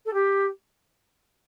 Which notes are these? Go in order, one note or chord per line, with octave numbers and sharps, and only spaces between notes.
A4
G4